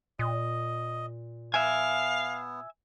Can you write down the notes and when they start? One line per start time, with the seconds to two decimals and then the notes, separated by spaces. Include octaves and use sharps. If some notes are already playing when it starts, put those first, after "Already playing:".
0.19 A#2 D#5
1.54 B3 E5 F5 G#5